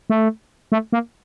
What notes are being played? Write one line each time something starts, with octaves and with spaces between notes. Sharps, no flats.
A3
A3
A#3